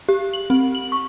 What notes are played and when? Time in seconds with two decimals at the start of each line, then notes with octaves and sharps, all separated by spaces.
0.09 G4
0.33 F#7
0.50 C4
0.75 F#7
0.92 C#6